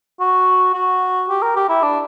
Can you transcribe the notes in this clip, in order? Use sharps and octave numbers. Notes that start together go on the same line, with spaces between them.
F#4
F#4
G4
A#4
G4
E4
D4